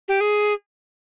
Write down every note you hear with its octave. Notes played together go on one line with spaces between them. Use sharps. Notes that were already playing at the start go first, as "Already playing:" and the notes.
G4
G#4